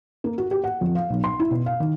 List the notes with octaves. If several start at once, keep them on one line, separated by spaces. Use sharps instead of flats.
A#3
F#4
G4
F#5
F2
F5
B1
C6
E4
B2
F5
D#3